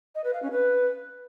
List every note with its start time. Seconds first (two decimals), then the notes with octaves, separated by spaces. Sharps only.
0.15 D#5
0.24 B4
0.33 F5
0.42 C#4
0.52 B4